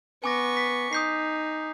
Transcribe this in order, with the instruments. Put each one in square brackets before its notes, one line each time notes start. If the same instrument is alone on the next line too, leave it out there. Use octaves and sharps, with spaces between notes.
[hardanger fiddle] B3 C#6 [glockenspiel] G#5 D6 A#6
[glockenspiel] B6
[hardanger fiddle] D#4 [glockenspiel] D#6 G6 C7